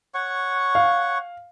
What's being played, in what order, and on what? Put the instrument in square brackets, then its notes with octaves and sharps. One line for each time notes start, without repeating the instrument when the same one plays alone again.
[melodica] C#5 F#5 C#6
[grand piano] F5